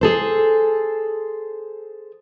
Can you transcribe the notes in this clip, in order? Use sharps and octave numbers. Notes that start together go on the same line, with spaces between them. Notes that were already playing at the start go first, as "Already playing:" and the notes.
G#4 A4 C5